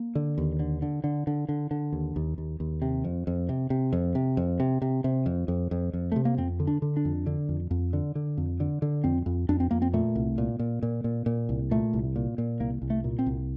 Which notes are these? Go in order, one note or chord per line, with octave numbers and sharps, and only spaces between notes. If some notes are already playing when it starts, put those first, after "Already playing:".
Already playing: A#3
D3
D#2
D3
D3
D3
D3
D3
D3
D#2
D#2
D#2
D#2
C3
F2
F2
C3
C3
F2
C3
F2
C3
C3
C3
F2
F2
F2
F2
C3 A3
A#3
F2 C4
D3
D4
D3
D4
F2
D3
F2
F2
D3
D3
F2
D3
D3
F2 C4
F2
F2 D4
C4
F2 A#3
C4
A#2 A3
C2
A#2
A#2
A#2
A#2
A#2
C2
A#2 A3
C2
A#2
A#2
C2 A#3
C2
A3
A#2
C4
C2